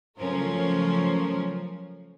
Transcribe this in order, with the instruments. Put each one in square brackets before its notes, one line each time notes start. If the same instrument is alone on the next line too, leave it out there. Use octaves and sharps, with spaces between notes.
[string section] C#3 F3 F#3 A3 C#4 A#4